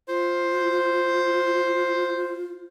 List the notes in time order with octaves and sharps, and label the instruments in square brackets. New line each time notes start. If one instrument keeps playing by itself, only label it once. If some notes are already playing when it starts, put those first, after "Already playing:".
[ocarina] F4 [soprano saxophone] C5